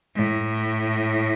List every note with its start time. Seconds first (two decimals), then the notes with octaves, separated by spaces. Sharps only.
0.15 A2